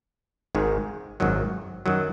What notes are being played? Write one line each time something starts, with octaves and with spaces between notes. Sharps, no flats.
G#1 G#2 D#3 G#3
G#1 F#2 D#3 F#3
F#2 D#3 F#3